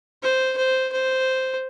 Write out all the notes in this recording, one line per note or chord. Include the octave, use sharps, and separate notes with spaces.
C5
C5
C5